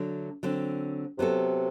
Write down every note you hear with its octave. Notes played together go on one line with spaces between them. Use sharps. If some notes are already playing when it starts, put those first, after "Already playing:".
Already playing: D3 F#3 A3 D4
D3 F#3 C4
C3 F#3 B3 F#4 A4